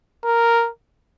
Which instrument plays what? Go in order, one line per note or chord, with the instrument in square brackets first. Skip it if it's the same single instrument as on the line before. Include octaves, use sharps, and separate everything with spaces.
[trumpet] A#4